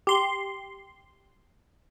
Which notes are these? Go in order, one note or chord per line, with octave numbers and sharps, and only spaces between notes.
G4 C6